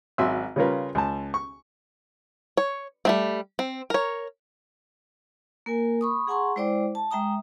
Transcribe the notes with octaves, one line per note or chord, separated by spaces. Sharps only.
G#1 F#3 E5 C6 E6
C#3 G3 C#4 F4 A#4 B4
C#2 A5
C#6
C#5
G3 A3 C4
C4
A#4 C#5
A#3 A#4 G#5
B5 C#6 D#6
G#4 F#5 G#5 A#5 C6 C#6
G#3 E4 C5 D5 G5 D6
A5
G#3 E5 G5 A#5 D#6